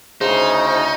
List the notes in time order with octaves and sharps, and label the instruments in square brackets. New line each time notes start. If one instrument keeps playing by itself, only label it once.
[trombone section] D2 A2 C#3 [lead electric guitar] D#4 [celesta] G#4 [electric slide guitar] C5